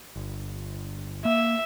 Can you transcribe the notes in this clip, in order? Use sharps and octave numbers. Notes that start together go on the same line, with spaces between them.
G1
A#3 E5